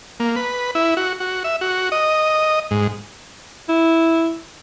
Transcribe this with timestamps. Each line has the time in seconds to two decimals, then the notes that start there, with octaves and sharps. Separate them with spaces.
0.20 A#3
0.36 B4
0.75 E4
0.97 F#4
1.20 F#4
1.44 E5
1.61 F#4
1.92 D#5
2.71 G#2
3.69 E4